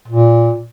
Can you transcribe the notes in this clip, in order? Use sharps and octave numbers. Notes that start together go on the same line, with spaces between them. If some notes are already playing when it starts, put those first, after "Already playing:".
A#2